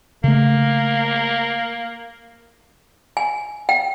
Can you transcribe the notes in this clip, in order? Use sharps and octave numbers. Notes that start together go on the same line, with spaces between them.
C#3 A3 A#3
G#5
G5